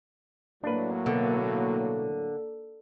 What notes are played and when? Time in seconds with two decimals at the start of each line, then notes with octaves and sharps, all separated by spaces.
0.63 A2 F#3 A#3 D4 B4
1.06 B2 D3